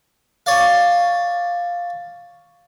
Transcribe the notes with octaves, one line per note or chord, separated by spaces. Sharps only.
C#5 D5 F5